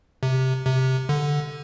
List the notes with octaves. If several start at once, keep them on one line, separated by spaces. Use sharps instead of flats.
C3
C3
D3